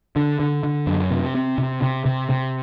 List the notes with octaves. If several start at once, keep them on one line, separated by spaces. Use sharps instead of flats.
D3
D3
D3
F#2
C3
C4
C3
C3
C3
C3